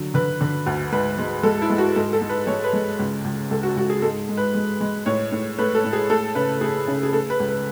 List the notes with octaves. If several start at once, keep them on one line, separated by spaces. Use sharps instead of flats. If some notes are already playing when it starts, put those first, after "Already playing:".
Already playing: D3 F#3
D3 B4
D3
D2
G#2 B4
G#3
G#3 A4
E4
G#3
F#4
G#2 A4
A4
G#2
B4
G#3 C#5
B4
G#3
C#2
C#2
C#2 A4
F#4
C#2 F#4
G#4
G#2 A4
G#2
B4
G#3
G#3
A2 C#5
A2
A3 B4
A4
A2
G#4
A3 A4
C#3 B4
A3 G#4
C#3
G#4
A3 A4
B4
C#2
B4